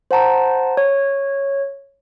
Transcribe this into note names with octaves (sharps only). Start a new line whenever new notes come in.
C5 F#5 A5 A#5
C#5